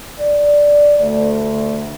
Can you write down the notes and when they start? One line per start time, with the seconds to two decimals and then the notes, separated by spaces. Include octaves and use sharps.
0.19 D5
1.00 D2